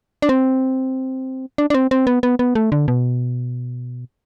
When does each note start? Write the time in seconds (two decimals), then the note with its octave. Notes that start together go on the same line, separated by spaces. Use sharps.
0.22 D4
0.29 C4
1.58 D4
1.70 D4
1.74 C4
1.91 C4
2.07 B3
2.23 B3
2.39 B3
2.55 A3
2.72 D3
2.88 B2